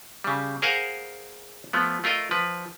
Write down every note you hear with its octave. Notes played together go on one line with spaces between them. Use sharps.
C#3 G3
G#4 A#4 C5 F5 F#5 G#5
F3 A3 B3
A3 F4 A#4 D#5
F3 B4